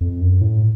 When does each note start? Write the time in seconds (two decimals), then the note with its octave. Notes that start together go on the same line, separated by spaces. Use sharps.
0.01 F2
0.21 F#2
0.41 A2